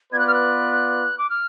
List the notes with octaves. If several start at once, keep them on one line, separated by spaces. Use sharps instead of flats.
B3 F4 B4 D5 G#6
F#6
F6
F#6
D6
F6